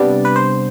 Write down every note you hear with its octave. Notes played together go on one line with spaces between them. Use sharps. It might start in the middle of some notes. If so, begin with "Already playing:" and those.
Already playing: C3 G3 B3 D4 D5
B4
C5